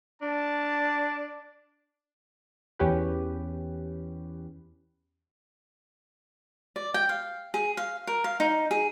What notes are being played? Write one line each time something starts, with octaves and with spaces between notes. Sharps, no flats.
D4 A5
E2 C#4 G4 B4
D5
G5
F5
G#4
F5
A#4
F5
D#4
G#4